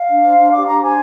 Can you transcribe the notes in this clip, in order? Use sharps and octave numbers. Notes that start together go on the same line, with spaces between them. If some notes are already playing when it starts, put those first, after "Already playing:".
Already playing: F5
D4
C5
D4
G4 D6
D4 A#5
C5 G#5